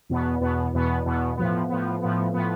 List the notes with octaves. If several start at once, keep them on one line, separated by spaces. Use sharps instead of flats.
E2 B2 B3
E2 B2 B3
E2 B2 B3
E2 B2 B3
A2 F3 B3
A2 F3 B3
A2 F3 B3
A2 F3 B3